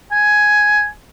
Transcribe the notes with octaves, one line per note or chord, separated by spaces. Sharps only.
G#5